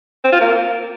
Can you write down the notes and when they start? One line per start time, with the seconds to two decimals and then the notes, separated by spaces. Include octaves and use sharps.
0.24 C4
0.32 F4
0.41 A#3